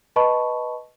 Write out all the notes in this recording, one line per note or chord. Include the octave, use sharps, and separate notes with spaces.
B4 D#5 A5 B5 C#6